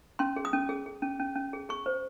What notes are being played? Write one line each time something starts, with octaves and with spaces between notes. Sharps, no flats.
C#4 C6
G#4
D#6
C#4
G#4
G#4
C#4
C#4
C#4
G#4
G#4 C#6
C5